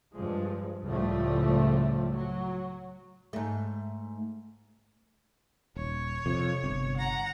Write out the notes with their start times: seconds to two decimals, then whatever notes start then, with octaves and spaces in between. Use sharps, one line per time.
0.14 G2 F3 G#3
0.83 C#2 A2 C#3 F3 G3 A3
2.12 F#3
3.33 G#2 A3
5.76 D#1 C#5
6.26 F2 C3
6.64 G1 C3
6.97 F#5 A#5